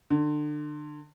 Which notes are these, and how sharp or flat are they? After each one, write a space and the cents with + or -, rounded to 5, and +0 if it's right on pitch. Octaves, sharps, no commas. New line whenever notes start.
D3 +30